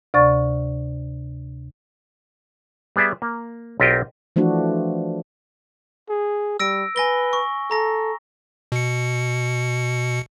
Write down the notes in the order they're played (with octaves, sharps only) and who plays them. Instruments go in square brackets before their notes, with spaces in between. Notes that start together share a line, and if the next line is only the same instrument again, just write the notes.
[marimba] D2 C3 D5 C#6 A6
[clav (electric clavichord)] G3 B3 G#4 D5 E5
A#3
B1 C4 F4 G4 A#4 D#5
[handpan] E3 F3 A3 D4 F#4
[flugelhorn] G#4
[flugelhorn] G3 [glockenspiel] E6 A#6 D7
[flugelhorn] B4 [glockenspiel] G#5 A#6 G7
[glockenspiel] C#6
[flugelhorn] A4 [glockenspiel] A#5 A#6
[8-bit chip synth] B2 C#7